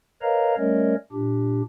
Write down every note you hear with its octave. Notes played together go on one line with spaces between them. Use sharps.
A#4 B4 C#5 D#5 F5 A#5
G3 A3 C#4 A#4 C#5 D#5
A#2 D4 G4